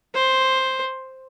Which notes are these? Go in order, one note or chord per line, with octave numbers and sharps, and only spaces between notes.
C5